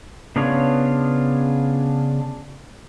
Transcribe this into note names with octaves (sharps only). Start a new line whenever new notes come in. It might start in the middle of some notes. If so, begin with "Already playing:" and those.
C#3 B3 D4 F4 C#5